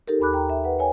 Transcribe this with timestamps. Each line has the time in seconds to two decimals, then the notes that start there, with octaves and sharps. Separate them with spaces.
0.08 D#4 G4 A4 A#4
0.20 D#2 G#5 B5 D6 F#6
0.33 G5 A#5
0.50 E5
0.64 B4 F#5
0.79 C#5 G5 G#5